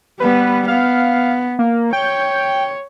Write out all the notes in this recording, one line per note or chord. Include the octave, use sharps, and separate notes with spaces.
G3 B3 B4
B3 F5
A#3
C#5 G5